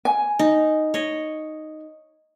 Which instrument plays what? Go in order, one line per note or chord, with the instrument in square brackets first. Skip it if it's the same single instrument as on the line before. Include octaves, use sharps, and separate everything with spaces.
[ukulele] G#5
[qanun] D#4
C#5 D#5